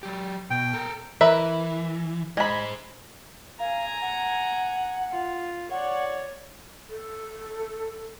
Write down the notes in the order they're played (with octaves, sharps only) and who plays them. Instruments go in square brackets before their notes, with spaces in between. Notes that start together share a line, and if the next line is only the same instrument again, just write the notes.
[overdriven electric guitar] F#3 G4
[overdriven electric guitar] B2 [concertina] G5
[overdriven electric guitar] A4 A#4
[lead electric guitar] E3 [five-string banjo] A#4 B4 E5
[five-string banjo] G#3 B5 [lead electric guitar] G#4 C5
[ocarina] F5 [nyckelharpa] G#5 A#5
[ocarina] F#5
[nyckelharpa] F4
[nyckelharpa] C#5 D5 [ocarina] F#5
[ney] A4